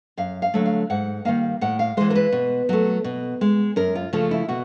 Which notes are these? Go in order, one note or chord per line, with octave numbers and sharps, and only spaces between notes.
F#2 F5
F5
D3 F#3 A3
F5
G#2 F#5
D#3 G3 A#3 F5
A2 F#5
F5
E3 G#3 C5
A#4
B4
B2
F#3 A3
B2
G#3
F#2 A#4
F4
C#3 F3 A3 F4
E4
B2 F#4